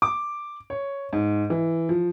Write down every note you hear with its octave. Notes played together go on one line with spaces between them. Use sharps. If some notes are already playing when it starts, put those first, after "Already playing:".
D6
C#5
G#2
E3
F3